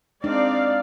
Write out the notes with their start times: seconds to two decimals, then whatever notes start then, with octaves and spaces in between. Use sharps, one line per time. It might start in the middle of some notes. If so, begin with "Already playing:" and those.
0.24 G#3 C4 D4 D#4 D5 F5